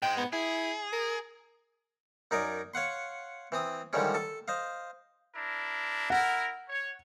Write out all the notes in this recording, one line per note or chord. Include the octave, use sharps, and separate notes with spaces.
G#2 G#3 G5
B3
E4 G#4
A#4
F#2 D#4 A#4 D5 G#5
C#5 F5 F#5 C6
E3 C4 D#6
D3 D#3 F3 G3 G#3 C#4
A4 A5
C5 D#5 F5
D4 E4 A#4
E4 A#4 F#5
C#5